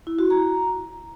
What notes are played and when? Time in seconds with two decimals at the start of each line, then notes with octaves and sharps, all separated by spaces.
0.07 E4
0.19 F#4
0.30 A#5